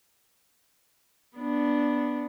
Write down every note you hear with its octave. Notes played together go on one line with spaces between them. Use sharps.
B3 D4